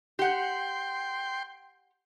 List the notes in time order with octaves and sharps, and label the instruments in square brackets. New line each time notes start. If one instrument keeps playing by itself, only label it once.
[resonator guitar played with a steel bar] G4 F#5 [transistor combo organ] G5 C6